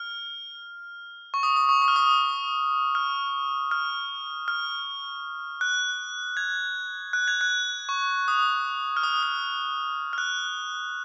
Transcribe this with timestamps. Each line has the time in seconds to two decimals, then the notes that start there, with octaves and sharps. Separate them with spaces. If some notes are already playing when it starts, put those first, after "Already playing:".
Already playing: F6
1.34 C#6
1.43 D#6
1.57 D#6
1.69 C#6
1.82 D#6
1.88 F6
1.96 D#6
2.95 F6
3.71 F6
4.48 F6
5.61 F#6
6.37 G#6
7.13 F#6
7.28 G#6
7.41 F#6
7.89 C#6
8.28 D#6
8.97 F6
9.03 D#6
9.23 F6
10.13 F6
10.18 F#6